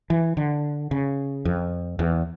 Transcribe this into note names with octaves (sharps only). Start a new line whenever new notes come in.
E3
D3
C#3
F2
E2